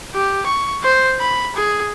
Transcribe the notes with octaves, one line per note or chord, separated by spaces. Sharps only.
G4
C#6
C5
B5
G#4